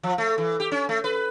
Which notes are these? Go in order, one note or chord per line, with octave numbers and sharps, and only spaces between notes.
F3
A3
E3
G4
C#4
A3
B4